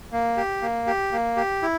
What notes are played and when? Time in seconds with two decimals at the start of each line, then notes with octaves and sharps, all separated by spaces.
0.12 A#3
0.37 G4
0.62 A#3
0.87 G4
1.12 A#3
1.37 G4
1.62 E4